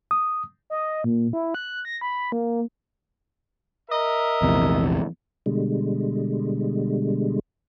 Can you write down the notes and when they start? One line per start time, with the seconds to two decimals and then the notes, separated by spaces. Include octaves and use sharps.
0.11 D#6
0.70 D#5
1.04 A#2
1.33 E4
1.55 F#6
1.85 A#6
2.01 B5
2.32 A#3
3.89 A#4 D#5 E5
4.42 A#1 E2 C3
5.46 B2 D3 G3 G#3